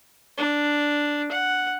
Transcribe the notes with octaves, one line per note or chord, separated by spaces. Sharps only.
D4
F#5